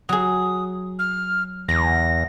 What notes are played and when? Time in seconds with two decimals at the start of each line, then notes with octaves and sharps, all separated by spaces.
0.09 F#3 G#4 D#6
0.99 F6
1.69 E2 A#6